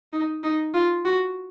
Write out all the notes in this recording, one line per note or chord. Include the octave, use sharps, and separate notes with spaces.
D#4
D#4
F4
F#4